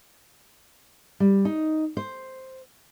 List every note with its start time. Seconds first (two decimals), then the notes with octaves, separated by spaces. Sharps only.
1.20 G3
1.45 D#4
1.97 C5